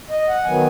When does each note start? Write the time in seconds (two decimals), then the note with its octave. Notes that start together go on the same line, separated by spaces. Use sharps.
0.10 D#5
0.29 F#5
0.45 D#3 F#3 B3 G#5